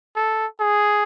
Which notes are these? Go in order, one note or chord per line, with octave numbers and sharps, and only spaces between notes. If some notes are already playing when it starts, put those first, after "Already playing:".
A4
G#4